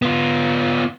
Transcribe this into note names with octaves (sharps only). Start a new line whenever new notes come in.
B3 F4